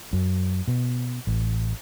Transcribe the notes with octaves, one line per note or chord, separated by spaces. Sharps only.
F#2
B2
A1